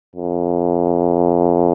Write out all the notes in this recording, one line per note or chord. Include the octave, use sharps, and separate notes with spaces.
F2